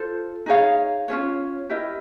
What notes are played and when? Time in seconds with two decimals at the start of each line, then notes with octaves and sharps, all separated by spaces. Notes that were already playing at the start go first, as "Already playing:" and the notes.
Already playing: F4 A4 C5
0.46 D#4 G#4 C#5 F5
1.08 C#4 F4 G#4 C#5
1.69 E4 G4 A#4 D#5